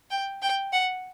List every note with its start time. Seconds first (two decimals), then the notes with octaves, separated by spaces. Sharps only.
0.10 G5
0.42 G5
0.73 F#5